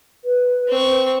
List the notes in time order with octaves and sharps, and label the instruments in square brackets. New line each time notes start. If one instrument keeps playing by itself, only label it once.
[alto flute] B4
[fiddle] C4 C#6